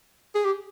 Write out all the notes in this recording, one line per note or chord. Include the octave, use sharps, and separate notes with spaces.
G#4
G4